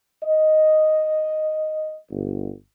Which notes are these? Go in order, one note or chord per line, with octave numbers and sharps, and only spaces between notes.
D#5
G1